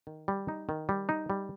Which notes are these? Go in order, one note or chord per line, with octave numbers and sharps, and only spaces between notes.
D#3
G3
D#4
D#3
G3
D#4
G3